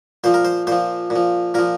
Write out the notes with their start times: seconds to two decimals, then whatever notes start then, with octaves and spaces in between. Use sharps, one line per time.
0.24 A#2 F3 C5
0.34 A#4
0.45 C5
0.67 A#2 F3 C5
1.10 A#2
1.16 F3
1.54 A#2 F3 A#4